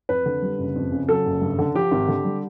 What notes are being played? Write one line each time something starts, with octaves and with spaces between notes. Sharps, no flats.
F2 B4
D3
G3
F#1
F2
C#3
F#3 A4
F#1
G2
D3
F3 G4
G#1
D3
G3